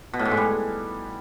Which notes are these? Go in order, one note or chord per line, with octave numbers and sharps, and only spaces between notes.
B2
A2
G#2
G#3
G3